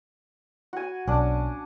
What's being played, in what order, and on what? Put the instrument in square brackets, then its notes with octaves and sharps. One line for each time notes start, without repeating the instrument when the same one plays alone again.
[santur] F#4 G#5
[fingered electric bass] B1 [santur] C#4 D4